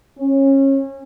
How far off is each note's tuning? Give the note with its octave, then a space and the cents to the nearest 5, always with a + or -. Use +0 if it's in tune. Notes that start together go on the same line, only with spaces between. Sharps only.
C#4 -25